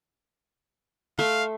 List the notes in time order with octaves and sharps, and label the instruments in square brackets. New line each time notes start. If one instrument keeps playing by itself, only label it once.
[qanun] A3 E5 C6 [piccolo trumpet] F5